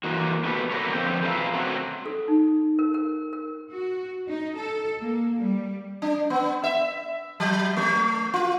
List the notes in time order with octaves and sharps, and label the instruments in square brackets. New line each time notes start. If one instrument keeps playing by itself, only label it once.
[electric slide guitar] E3 A#3 F#4
B3 F#4 G4 A4 B4
D3 A#3 F#4 A#4 B4 C#5
F2 D3 F3 C4 G5
G#4 A#4 B4 E5 F5
F#3 A3 C4 F4 F#4
[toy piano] A4
D#4
A#4
A#4
A#4
[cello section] F#4
D#4
A4
A#3
G3
[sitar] D4
B3
E5
F#3
A3
F4